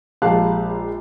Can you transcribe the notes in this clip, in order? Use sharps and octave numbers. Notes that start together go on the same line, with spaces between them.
A#1 G#3 G4 F5 A5 F#6